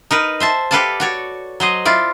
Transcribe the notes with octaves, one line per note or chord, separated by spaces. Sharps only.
D#4 A#4 B4
C5 E5 A5
G4 A4 B4 D5 F5 A5
F#4 C#5 D5
F#3 C5 D#5
E4 F4 D5